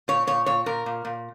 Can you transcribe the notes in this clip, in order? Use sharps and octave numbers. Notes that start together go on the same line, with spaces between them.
A#2 C#5
A#2 C#5
A#2 C#5
A#2 A#4
A#2
A#2